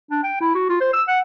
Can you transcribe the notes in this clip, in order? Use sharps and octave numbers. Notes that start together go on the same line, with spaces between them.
D4
G5
E4
F#4
F4
C5
E6
F#5